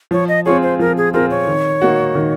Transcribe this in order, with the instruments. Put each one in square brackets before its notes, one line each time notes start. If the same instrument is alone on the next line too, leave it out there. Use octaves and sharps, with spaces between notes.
[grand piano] F3 [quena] C#5
[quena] D#5
[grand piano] C4 F4 G#4 [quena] C#5
[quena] C5
[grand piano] F3 [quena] A#4
[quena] G#4
[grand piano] C4 F4 G#4 [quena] A#4
[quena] C#5
[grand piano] D#3
A#3 D#4 F#4
D#3